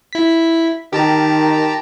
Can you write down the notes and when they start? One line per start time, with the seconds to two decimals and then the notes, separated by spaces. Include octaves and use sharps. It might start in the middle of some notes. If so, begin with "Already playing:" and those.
0.13 E4 B6
0.93 D#3 G4 A5 A#5